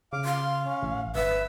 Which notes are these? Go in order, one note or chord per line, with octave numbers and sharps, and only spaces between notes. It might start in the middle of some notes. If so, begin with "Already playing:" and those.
C#3 F5 D6
F5 C6
C#4
A1
G1 B4 E5 E6